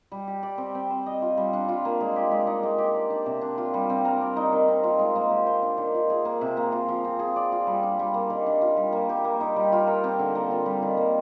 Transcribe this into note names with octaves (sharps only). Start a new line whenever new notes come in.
G3
G4
D5
C4
C4
C5
D#5
F4
G3
D4
F4
A#3
G#3
G4
G#3
D#4
G#3
G4
D5
D4
C3
D4
F4
G3
C4
A#4
D5
D#4
D#3
C4
F4
G#3
A#3
G4
C5
D4
D#3
F4
G#4
A#3
C3
A#3
F4
F3
C4
G#4
D5
F4
G3
D4
G3
A#3
D#3
D4
F4
G3
A#3
G4
A#3
D#4
G3
F4
A#4
C4
D3
A#3
F4
G3
D#3
A#3